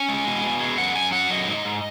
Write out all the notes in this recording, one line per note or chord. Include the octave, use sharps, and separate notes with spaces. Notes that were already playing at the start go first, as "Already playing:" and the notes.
Already playing: C#4 G#5
G#3
B2
B2
G#3
F#2 F#5
F#2 G#5
F#3 F#5
F#2 D#5
G#2
G#2